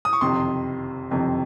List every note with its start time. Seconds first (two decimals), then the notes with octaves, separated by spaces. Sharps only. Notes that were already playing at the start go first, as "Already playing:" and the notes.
0.05 D#6
0.13 C#6
0.21 F#1 F2 C3 D#3 C6
1.11 F#1 F2 C3 D#3